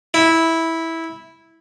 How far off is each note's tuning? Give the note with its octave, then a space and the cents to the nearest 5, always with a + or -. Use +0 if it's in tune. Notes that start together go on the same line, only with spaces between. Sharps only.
E4 -10